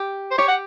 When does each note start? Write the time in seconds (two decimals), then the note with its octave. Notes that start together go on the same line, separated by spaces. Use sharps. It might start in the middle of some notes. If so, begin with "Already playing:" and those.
Already playing: G4
0.31 C5
0.38 G4 C#5
0.48 F#5